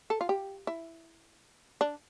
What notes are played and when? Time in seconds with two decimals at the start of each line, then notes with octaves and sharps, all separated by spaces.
0.10 A4
0.21 F4
0.29 G4
0.67 E4
1.81 D4